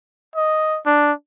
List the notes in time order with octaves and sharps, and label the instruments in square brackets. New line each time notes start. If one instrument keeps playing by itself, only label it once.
[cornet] D#5
D4